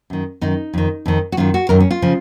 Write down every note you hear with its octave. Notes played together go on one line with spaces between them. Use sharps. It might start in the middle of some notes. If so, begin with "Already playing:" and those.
F#2 D#3
F#2 D#3 D#4
F2 D#3
F2 D#3
F#4
F#2 D#3 F4
F#4
F#2 D#3 A#4
C#4
F4
C#3 F3